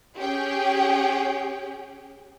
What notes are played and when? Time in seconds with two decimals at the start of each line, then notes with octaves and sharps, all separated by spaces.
0.17 C#4 G4 G#4 G5